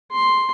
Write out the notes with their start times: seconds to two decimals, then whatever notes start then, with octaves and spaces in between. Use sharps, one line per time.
0.12 C6